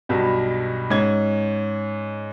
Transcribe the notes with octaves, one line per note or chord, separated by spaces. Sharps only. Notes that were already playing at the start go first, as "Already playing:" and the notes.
B1 G2 B2
G#2 C#4 G#6